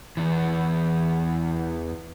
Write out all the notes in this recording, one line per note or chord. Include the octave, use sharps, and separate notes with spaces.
E2 E3